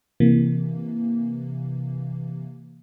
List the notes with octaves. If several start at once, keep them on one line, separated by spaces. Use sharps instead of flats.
C3 E3 A#3